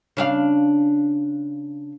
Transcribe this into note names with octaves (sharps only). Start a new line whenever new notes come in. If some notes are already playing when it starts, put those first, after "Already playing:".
C#3 D4 F5